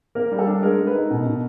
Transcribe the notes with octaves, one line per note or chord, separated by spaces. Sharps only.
A#3 A#4
G3
A4
D4
G#3 A#4
G#3
B4
D#4
B2
B2